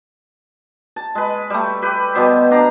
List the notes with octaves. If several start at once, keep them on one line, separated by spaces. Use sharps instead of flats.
A5
G#3 B4
G3 A3
G4 B4
B2 G3 B3 C5
D4 A#5